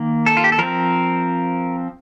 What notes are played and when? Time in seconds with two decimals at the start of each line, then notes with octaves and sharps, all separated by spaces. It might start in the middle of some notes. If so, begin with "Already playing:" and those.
Already playing: D#3 A#3
0.26 A4
0.37 F4
0.44 G4
0.52 A4
0.58 F3 C4 A#4